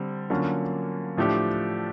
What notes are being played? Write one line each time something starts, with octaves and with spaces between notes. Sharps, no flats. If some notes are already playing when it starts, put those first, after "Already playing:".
Already playing: D3 G3 C4
D3 F#3 A#3 C#4 F4
A2 F3 A3 D4 G4